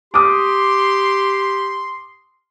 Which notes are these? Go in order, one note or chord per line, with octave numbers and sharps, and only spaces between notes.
G4 C6 D6 D#6